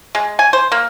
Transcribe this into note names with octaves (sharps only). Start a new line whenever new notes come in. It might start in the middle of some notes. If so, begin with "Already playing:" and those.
G#3
G#5
C5
A#3